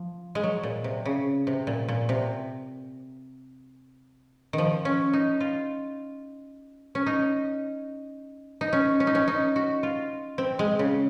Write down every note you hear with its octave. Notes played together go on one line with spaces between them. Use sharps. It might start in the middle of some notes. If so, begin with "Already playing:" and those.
Already playing: F3
G#3
F#3
A#2
C3
C#3
C3
A#2
A#2
C3
D#3
F3
C#4
D#4
F4
C#4
D#4
D#4
C#4
C#4
D#4
C#4
D#4
F#4
F4
C4
G#3
C#3